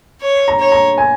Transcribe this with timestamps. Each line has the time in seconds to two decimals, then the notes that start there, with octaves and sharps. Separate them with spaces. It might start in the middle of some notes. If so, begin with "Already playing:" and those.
0.22 C#5
0.48 A#5
0.60 C#5
0.72 A#5
0.98 G#5